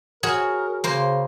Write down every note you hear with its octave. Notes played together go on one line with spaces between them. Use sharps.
F#4 G#4 A#4 C#5
C#3 A#3 C5